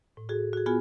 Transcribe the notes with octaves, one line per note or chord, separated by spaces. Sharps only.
A2
F#4 G#4 A4
F#4 G#4
B3 F4 F#4 G#4 G#5